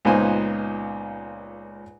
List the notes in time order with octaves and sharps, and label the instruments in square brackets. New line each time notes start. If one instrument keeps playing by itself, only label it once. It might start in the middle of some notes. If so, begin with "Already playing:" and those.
[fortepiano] C#2 A#2 B3 D#4 C5 G#5